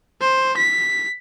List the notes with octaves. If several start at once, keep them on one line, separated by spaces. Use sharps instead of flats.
C5
B6